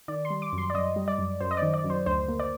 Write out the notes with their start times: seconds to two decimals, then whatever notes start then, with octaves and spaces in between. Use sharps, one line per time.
0.08 D#3 D5
0.25 C6
0.30 G3
0.42 D6
0.53 F#2
0.58 C6
0.70 D5
0.74 F#2 D#5
0.96 G3
1.08 D5
1.18 F#2
1.41 F#2 C5
1.51 D#5
1.57 D5
1.62 D#3
1.74 D5
1.84 F#2
1.90 C5
2.06 D2 C5
2.28 A#3
2.39 D5